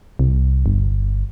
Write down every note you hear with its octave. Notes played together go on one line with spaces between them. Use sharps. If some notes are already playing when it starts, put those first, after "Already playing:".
C2
G1